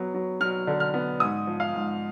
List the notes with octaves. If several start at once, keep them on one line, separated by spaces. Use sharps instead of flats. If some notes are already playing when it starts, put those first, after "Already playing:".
Already playing: F#3 B3
F#3
F#3 F6
D3
F6
B3
G#2 D#6
F3
F5
G#2